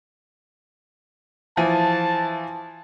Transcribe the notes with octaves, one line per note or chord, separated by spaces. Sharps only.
E3 F3 G#5 A5